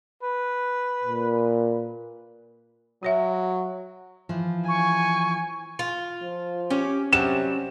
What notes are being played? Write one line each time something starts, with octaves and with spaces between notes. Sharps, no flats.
B4
A#2
F#3 F#4 C#5 E5
E3 F3
G#5 C#6
F4
F3
C#4 G4
C3 F#3 G3 E7